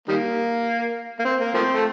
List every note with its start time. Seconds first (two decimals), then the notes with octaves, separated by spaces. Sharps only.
0.08 D#3 G3 A#3
1.19 A#3
1.25 C4
1.40 A#3
1.54 F3 A3 C4
1.74 A3